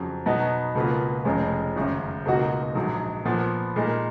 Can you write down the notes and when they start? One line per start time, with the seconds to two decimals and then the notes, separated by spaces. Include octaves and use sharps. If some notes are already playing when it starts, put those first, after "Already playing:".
Already playing: F2 C#3 F#3
0.26 B2 F#3 B3 D#4
0.75 C#2 B2 A#3 F4 B4
1.25 F1 F2 C#3 G#3 C#4
1.76 G#1 F#2 C#3
2.25 C#2 B2 A#3 D#4 F#4
2.75 A#1 G#2 F#3
3.25 A#2 F3 B3
3.76 A#2 G#3 D#4 A#4